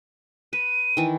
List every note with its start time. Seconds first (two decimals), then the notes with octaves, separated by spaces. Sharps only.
0.53 B4 D#7
0.97 D#3 E3